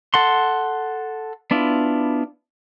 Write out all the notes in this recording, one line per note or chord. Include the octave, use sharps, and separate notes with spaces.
A4 F#5 C6
B3 D4 E4 F4